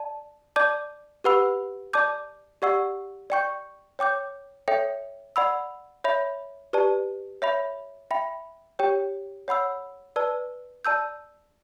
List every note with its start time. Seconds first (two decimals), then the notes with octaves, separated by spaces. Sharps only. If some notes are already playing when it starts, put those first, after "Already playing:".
Already playing: D5 A5
0.56 D5 A5 D6 G6
1.24 G4 B4 F#5 B5 E6
1.93 D5 A5 D6 G6
2.62 G4 D5 F#5 C#6 E6
3.30 D5 G5 C#6 G6
3.99 C#5 G5 D6 G6
4.68 A4 C#5 E5 G5
5.36 D5 F#5 B5 E6
6.04 C#5 E5 B5
6.73 G4 B4 D5 A5
7.42 C#5 E5 B5
8.11 E5 G5 B5
8.79 G4 C#5 G5
9.48 C#5 F#5 B5 E6
10.16 B4 D5 A5 E6
10.85 D5 A5 E6 G6